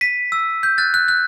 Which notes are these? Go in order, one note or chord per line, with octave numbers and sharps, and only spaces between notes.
B6 D#7
E6
G6
F#6 A6
F#6
F#6